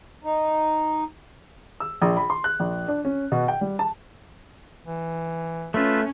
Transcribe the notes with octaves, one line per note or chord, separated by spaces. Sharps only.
D#4
E6
A#1
B5
C6
F#6
A#1
D4
C#4
B2
G5
G3
A5
E3
A3 C#4 F4 B4 E5